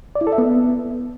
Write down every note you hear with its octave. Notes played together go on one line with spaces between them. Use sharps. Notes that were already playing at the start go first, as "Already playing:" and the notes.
D5
E4
A4
E5
B3